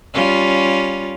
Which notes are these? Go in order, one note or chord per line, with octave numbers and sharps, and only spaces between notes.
G3 C#4 F4